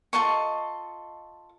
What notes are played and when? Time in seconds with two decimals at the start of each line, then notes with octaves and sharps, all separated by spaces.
0.13 F4 A4 D#5 C#6